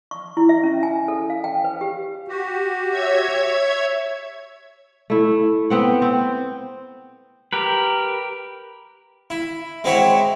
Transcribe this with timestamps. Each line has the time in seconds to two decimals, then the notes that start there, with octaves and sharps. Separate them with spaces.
0.11 C#6
0.37 E4
0.49 E5
0.63 C#4
0.83 G#5
1.08 A4
1.30 F5
1.44 G5
1.64 B4
1.81 G4
2.28 F#4 G4
2.90 C#5 E5 G#6
5.10 A3 E4
5.70 B3 C4 F#5
6.02 C4
7.53 G4 A#4 B4
9.30 E4
9.84 G#3 C4 E4 F#4 C#5 E5